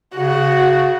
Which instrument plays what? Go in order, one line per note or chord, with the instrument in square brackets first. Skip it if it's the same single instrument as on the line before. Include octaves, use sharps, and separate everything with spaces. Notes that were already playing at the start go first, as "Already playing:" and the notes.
[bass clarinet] C#3 [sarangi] F#4